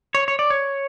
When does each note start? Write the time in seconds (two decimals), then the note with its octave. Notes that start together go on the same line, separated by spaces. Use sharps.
0.15 C#5
0.28 C#5
0.39 D5
0.50 C#5